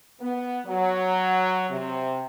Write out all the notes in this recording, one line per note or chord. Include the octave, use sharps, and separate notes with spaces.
B3
F#3
C3